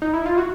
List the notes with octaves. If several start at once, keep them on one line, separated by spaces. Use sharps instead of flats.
D#4
E4
F4
F#4